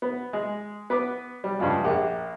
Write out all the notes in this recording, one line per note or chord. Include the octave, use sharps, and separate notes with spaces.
B3
G#3
B3 B4 D6
G3
G2 C#3 F3 G#3
A#1 A#3 G4 F#5